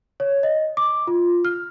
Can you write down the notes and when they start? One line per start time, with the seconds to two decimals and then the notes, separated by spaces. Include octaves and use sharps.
0.20 C#5
0.43 D#5
0.77 D6
1.07 F4
1.45 F6